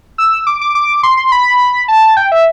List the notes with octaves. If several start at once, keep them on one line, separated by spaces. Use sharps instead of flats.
E6
D6
D6
D6
C6
C6
B5
A5
G5
E5